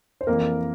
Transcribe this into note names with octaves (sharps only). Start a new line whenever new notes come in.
C5
F2 E3 A#3 A#4